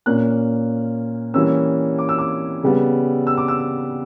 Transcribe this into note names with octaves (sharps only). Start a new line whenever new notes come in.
A#2 A#3 C#4 F#6
E3 G3 A#3 C#4 E6
D6
E6
D6
C#3 G3 B3
E6
D6
E6